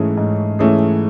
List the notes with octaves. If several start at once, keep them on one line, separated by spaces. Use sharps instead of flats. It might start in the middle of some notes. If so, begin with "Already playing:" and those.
Already playing: G#2 E3 A3 C#4 G#4
G#2
E3 A3 C#4 G#4